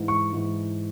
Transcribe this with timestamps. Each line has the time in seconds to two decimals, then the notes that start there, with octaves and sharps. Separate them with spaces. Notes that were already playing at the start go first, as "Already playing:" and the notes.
Already playing: G#2 E3
0.08 C#6
0.32 G#2 E3